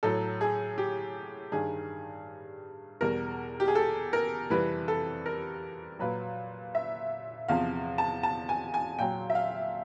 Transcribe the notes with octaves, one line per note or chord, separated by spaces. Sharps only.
A2 F#3 A4
G#4
G4
G2 D#3 G3 G#4
E2 B2 G3 A#4
G4
G#4
A4
A#4
F2 C3 E3 G3 B4
A4
A#4
A#2 F#3 B4
E5
E2 C3 F3 F5
A5
A5
G#5
G#5
A#2 F#3 G5
E5
F5